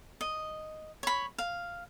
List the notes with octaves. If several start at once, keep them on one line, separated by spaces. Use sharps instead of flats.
D#5
C#5 B5
F5